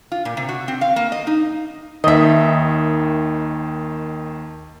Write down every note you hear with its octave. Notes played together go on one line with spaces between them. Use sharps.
F4
A#2
C3
F#4
C4
F5
A#3
D#5
D#4
D#2 D#3 D#5 E5